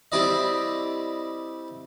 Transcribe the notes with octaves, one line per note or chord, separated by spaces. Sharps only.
G3 C4 E4 D5 D#5